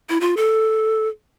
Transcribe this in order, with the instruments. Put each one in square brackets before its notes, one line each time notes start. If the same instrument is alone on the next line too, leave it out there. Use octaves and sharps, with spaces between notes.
[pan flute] E4
F4
A4